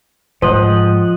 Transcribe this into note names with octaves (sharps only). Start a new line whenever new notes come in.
G#2 F3 C5 D#5 F#5